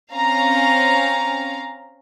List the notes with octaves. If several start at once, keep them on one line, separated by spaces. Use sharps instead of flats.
C4 C#4 F5 A#5